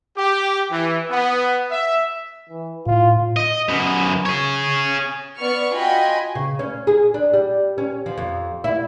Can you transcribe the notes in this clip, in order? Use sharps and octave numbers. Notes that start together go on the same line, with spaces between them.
G4
E3
B3
E5
E3
A2 F4
D#5
F#2 B3
G#4 C#5
B3 D5 C#6 F6
F4 F#4 D#5 G5 G#5 B5
C#3
C#4
G#4
D4
G3
C#4
F3
F2
E4